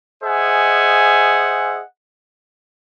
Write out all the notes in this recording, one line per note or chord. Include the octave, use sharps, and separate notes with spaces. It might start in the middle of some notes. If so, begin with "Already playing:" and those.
G#4 C5 D#5 E5 F#5 G#5